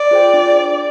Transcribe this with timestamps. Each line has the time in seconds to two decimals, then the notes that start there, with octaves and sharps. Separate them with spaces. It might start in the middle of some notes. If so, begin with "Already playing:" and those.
Already playing: D5
0.11 F4 G#4 C5 G5
0.34 D4